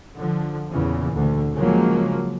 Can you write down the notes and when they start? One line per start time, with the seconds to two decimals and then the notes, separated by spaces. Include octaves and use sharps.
0.17 D3 F3
0.72 A#1 E2 A#2 C#3 E3
1.14 D2 D3
1.53 C#3 F3 F#3 G#3 A#3